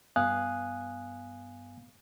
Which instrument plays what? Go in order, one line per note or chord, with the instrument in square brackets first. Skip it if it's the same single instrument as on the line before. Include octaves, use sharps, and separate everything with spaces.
[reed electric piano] G2 B3 F5 G#5 D#6 F#6